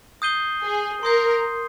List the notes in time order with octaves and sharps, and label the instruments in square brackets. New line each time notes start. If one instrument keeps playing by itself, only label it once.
[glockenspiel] D#6 G6 C7 D#7 G7
[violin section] G#4
[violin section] A#4 [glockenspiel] C6 D#6 G6 C7